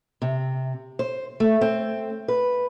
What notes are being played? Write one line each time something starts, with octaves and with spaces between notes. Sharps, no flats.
C3
C5
A3
C4
B4